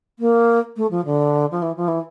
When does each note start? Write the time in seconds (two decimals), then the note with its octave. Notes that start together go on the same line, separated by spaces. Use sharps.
0.19 A#3
0.76 A3
0.91 F3
1.05 D3
1.51 F3
1.62 E3
1.76 F3
1.88 E3